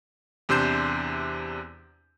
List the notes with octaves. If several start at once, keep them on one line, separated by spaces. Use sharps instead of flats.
E2 C3 D4 C6 G6 E7